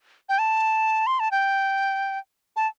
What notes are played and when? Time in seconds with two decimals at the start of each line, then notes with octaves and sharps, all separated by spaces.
0.29 G5
0.39 A5
1.07 C6
1.20 A5
1.31 G5
2.56 A5